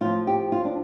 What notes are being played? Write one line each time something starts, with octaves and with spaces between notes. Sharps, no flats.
A2 F3 F4
G4
F4
D4